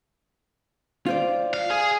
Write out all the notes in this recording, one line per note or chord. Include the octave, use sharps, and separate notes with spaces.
F4 C5 D5
F5
G#4